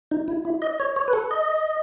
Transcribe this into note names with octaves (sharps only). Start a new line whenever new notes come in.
D#4
E4
E4
D#5
C#5
C#5
B4
A4
D#5